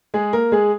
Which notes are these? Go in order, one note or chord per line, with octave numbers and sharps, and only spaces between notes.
G#3 G#4
A#3 A#4
G#3 G#4